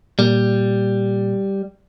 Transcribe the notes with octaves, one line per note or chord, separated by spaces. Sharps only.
A#2 G3